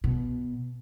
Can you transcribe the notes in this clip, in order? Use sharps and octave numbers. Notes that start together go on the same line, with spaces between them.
B2